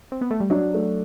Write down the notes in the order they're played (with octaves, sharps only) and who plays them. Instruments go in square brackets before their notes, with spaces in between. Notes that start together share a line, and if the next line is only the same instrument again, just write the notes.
[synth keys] C4
B3
A3
G3
[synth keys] F#3 [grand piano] D4
[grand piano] A3